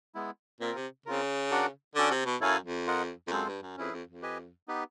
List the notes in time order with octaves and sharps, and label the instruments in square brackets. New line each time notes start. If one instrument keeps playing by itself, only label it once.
[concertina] G#3 B3 E4
[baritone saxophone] A#2 [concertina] C4 F4 A#4
[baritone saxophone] C3
[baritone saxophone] C#3 [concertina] C4 F4 A#4
[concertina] D4 F#4 A#4 D5 F#5
[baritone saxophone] D3 [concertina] C#4 F#4 A4 D5
[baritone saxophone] C3
B2
[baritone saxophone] F#2 [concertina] E4 A4 C#5 F5 G#5
[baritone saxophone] F2
[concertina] F4 A#4 D#5 F#5
[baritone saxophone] F2
[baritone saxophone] F#2 [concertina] G#3 C4 F4 A4 C5
[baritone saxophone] G2
F#2
[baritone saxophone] F2 [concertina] C#4 E4 G#4 B4
[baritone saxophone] F2
F2
[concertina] G4 B4 D#5 G#5
B3 D#4 G4 B4